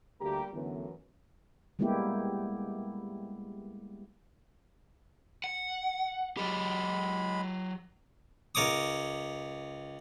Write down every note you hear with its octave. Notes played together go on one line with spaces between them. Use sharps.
D2 G3 A3 A#3 G4 A#5
F#2 D3 E3 A3 B3
G3 G#3 A#3 B3 E4 G4
F#5
F#3 G#3 G4 B5
C#2 A#4 C#5 D6 D#6